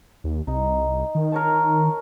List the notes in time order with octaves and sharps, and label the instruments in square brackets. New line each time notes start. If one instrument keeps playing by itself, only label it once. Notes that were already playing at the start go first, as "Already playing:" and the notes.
[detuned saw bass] D#2
[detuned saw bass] C2 [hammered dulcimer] D#4
[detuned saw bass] D#3
[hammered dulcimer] A#4 C#5 A5